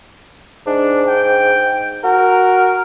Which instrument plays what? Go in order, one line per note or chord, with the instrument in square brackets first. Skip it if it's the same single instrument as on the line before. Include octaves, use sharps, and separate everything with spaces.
[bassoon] G#2 [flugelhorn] D4
[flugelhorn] G5
[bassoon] F#4 [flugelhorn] A#4